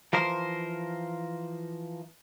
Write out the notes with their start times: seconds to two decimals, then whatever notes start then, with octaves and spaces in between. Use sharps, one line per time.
0.13 E3 F3 A#4 C5